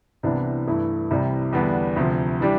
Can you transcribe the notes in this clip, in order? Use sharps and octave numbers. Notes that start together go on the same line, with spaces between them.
C2 C3 E3 B3 D4
G2 E3 A3 E4
C2 C3 E3 G3
E2 D3 G3 B3 D4
D2 C3 F3
E3 G3 D4 G4